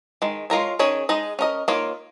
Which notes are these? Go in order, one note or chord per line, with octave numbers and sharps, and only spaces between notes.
D#3 G#3
G#3 F4 A#4 C#5
D#3 C#4 G#4 C#5
G#3 D#4 G#4 D#5
C#4 A#4 D#5
D#3 A#3 F4 C#5